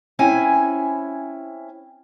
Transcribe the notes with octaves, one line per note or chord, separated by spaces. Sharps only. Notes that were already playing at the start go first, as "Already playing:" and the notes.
C4 C#4 E4 E5 G#5